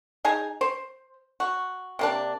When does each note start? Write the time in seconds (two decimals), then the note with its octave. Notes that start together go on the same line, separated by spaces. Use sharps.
0.25 D#4 G#4 G#5 A#5
0.61 C5
1.40 F#4
1.99 C3 A#3 D4